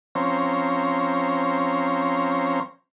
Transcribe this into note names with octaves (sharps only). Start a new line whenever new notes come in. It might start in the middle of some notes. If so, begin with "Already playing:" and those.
F3 C4 C#4 C5 C#5 A#5